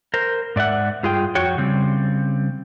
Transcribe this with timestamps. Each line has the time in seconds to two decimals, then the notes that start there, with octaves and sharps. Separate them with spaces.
0.14 A#4 C5
0.56 G#2 D5 E5 F#5
1.03 G2 F4 G#4 G5
1.35 F2 F#4 C#5 G5
1.58 C#3 G3 C4